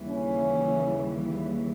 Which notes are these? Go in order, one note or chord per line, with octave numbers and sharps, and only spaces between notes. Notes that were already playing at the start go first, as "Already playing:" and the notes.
Already playing: D#2 C#3 E3 G3 A#3
C#4